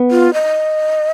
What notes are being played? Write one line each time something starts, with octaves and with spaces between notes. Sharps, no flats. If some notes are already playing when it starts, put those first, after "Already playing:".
Already playing: B3
F4
D#5